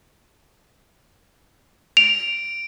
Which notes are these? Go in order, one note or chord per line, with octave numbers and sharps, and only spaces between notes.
D7 F7